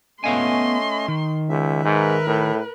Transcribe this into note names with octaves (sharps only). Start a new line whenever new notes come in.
A3 B3 C#4 D#5 F5 G#5 C6
D#3
C#2 E5
G#2 A#4 B4
A2